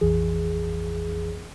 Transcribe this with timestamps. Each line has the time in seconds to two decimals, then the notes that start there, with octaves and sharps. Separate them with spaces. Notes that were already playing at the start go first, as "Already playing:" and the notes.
0.01 A#1 F2 E3 G#4